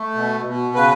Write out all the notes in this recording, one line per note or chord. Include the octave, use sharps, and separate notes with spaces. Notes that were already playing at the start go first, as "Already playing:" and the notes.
Already playing: A3
B2
B2
C#3 B4